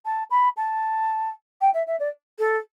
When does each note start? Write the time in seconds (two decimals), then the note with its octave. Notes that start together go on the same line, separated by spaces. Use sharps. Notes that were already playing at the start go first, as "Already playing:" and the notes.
0.05 A5
0.31 B5
0.57 A5
1.61 G5
1.74 E5
1.87 E5
2.00 D5
2.39 A4